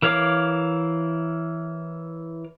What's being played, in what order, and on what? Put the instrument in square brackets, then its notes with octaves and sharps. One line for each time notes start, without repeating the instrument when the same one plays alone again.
[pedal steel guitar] E3 A#4 C#5 F5 D6